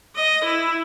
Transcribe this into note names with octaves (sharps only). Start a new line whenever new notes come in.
D#5
E4